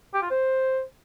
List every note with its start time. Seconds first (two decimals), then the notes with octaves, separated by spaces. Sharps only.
0.14 G4
0.22 F4
0.30 C5